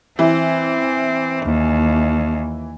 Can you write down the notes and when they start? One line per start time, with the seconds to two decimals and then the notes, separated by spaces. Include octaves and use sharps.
0.19 E3 C4
1.45 D#2